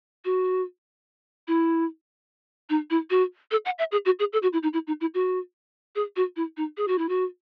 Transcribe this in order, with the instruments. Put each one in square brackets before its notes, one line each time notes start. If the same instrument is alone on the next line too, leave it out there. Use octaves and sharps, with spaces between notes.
[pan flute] F#4
E4
D#4
E4
F#4
A4
F#5
E5
G#4
F#4
G#4
A4
F#4
E4
D#4
E4
D#4
E4
F#4
G#4
F#4
E4
D#4
G#4
F#4
E4
F#4